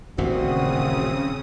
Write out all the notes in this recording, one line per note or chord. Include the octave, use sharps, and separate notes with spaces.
D#1 A1 A#2 C#3 C4 F#4 D#6